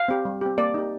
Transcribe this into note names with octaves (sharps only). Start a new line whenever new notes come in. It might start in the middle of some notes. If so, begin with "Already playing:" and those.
Already playing: F5
C4 G4
G3
C4 G4
A#3 D5
D#4 G4